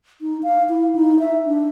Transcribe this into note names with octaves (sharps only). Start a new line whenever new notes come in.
D#4
F5
E4
D#4
E5
D4